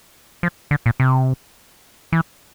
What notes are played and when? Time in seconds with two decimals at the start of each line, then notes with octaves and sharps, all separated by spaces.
0.43 F3
0.71 D3
0.86 A#2
1.00 C3
2.12 E3